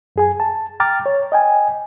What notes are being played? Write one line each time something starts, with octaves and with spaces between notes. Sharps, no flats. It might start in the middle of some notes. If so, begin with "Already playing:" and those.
F#2 G#4 G#5
A5
G5 A#5 D6 F6 A6
C#5
D#5 G5 G#5